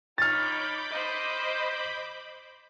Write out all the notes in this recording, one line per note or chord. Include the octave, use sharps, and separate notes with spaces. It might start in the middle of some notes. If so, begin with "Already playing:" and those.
D#4 C#5 B5 D6 F6 G6 A6
C5 D#5